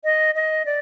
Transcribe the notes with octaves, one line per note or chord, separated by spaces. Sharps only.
D#5
D#5
D5